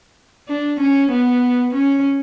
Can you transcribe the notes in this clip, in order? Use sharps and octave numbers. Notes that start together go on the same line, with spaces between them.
D4
C#4
B3
C#4